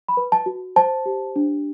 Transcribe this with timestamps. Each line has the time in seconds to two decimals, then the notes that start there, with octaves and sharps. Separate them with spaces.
0.09 B5
0.17 B4
0.32 A5
0.46 F#4
0.76 C5 A5
1.06 G4
1.36 D4